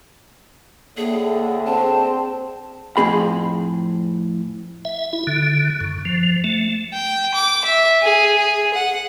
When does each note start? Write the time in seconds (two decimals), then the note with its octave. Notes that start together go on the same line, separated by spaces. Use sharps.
0.97 D2 A2 D3 A#3 G#4
1.67 C4 G#4 A5
2.97 F2 A2 C4 G#4 B5
4.85 E5
5.13 E4
5.27 D3
5.81 F#2
6.05 F3
6.44 A3
6.93 G5
7.34 D6
7.64 E5
8.02 G#4
8.37 G#4
8.74 F#5